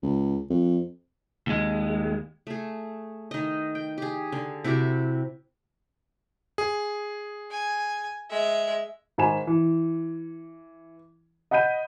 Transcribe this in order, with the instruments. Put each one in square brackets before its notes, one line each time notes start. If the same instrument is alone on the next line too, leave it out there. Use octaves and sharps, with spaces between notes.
[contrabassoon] C#2
F2
[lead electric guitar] D#2 G#3
[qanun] A3 G#4
D#3 D#5
G5
G4 G#4
D3
C3 E4 F#4 G4
[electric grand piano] G#4
[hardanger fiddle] G#5
G#3 E5
[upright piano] G#2 D#3 C5 G#5 B5 E7
E3
D#5 F#5 B5 G6 D#7